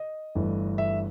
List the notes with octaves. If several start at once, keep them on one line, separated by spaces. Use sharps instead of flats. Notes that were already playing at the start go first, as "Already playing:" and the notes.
Already playing: D#5
G1 G2 E3 A3
E5